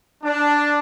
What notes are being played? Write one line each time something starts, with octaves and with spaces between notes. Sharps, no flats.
D4